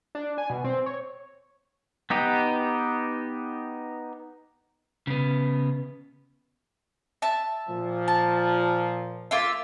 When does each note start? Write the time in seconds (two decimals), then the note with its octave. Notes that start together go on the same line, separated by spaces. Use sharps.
0.15 D4
0.38 G#5
0.50 B2
0.64 C4
0.86 C#5
2.10 B3 D#4 G4
5.07 C#3 B3
7.22 E5 A5
7.69 A#2 F3
8.08 A5
9.31 A#3 F4 E5